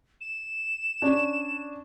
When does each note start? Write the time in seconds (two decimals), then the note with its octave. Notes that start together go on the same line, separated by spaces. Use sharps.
0.21 E7
1.02 C#4 D4